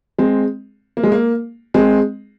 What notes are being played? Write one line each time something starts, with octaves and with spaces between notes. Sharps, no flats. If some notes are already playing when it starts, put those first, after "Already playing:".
G#3 C4
A#3
G#3
A#3
G#3 C4